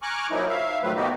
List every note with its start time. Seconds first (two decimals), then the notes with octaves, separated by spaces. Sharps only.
0.02 G#5 A#5 C#6 D6 F6 F#6
0.31 F3 F#3 A#3 D#4 E4
0.49 E5 F5
0.83 A2 D#3 F3 F#3 A3 B4
0.96 B2 A#3 B3 D#4 F#4 G4